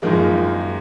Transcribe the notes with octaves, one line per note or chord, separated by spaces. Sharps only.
F#2 D#3 F3 G#3 A#3